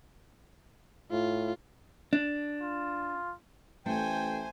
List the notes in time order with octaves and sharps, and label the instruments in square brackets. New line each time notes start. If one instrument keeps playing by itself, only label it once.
[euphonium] A2 [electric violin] F4
[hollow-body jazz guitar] D4
[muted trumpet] F4
[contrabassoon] A1 [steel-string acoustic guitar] A3 [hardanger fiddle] C5 G#5 [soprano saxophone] G5